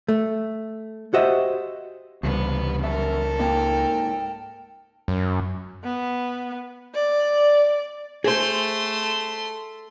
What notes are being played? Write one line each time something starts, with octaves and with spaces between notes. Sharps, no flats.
A3
F#4 G4 C5 D#5 E5 F#5
C#2 G2 C3 E3 G3 B3
F#2 A4 A#4 E5
G#2 A#3 D#4 G5
F#2
B3
D5
A3 G#4 C5 C6